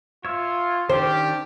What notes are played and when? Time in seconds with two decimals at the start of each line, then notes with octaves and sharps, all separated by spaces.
0.25 F4 C#5 E5
0.89 D#3 C#4 D4 G4 C5